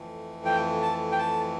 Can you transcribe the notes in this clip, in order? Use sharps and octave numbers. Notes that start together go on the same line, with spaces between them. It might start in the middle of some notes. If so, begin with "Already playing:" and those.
Already playing: F2 E3 A3
G5
A5
G5
A5